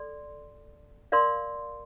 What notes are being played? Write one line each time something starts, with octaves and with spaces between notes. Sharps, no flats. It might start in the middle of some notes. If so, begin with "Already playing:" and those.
Already playing: A4 D5 C6
A#4 D5 F5 C6